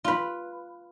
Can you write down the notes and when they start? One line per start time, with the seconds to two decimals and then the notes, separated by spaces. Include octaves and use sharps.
0.04 F4 B4